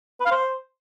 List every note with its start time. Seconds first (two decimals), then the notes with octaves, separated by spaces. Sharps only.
0.20 B4
0.25 F5
0.31 C5